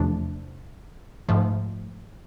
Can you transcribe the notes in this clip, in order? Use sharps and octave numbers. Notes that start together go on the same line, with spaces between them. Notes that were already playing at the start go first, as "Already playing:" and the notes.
Already playing: E2 C3 F3 A3 D4
G#2 F3 A3